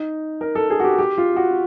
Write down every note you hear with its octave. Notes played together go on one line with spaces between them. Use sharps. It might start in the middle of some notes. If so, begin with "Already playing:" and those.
Already playing: D#4
A#4
A4
G#4
F#4
G4
G4
F4
F#4